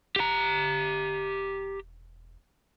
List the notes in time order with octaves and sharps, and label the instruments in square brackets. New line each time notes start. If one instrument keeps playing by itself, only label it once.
[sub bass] E1 [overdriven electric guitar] G4 A#5